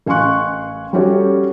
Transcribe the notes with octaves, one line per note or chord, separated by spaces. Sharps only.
A1 F5 G#5 C6 C#6 F#6
G3 C#4 F#4 G4 A4 C#5